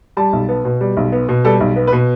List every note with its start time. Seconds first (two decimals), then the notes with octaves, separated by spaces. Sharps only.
0.17 G3 A5
0.33 B1
0.49 B3
0.65 B2
0.81 G3
0.97 B1
1.12 B3
1.29 B2
1.44 G3 A4
1.60 B1
1.76 B3
1.87 B4
1.92 B2